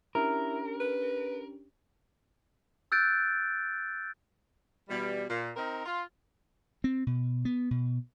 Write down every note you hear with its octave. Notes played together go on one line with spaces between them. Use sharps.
C#4 D4 E4 G4 A#4
B4
E6 F#6 G6 A6 D7
B2 E3 G3
A#2
C4 D#4 A#4
F4
C4
B2
B3
B2